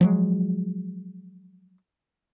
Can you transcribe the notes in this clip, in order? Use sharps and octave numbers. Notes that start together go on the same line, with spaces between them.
F3 F#3 G#3